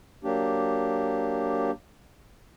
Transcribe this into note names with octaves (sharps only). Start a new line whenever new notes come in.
F#3 A#3 D4 G4